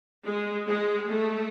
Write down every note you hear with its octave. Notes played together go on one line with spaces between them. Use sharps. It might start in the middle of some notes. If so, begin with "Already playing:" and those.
G#3
G#3
A3